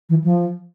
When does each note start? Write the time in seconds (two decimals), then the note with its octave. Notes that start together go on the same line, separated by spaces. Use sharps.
0.09 E3
0.24 F3